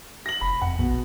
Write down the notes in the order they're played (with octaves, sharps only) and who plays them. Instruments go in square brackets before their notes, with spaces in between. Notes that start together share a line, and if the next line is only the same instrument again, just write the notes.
[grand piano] A#6 F#7
[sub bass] F1 [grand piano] B5
[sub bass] F2 [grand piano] F#5
[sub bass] A#1 [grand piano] B2